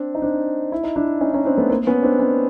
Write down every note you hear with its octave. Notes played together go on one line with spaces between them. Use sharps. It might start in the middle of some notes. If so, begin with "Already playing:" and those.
Already playing: C4 D4
D#4
C4 D4
E4
D#4
D4 E4
C#4 D#4
C#4 D#4
C4 D4
A3 B3
A#3 C4
B3 C#4
C4 D4
C#4 D#4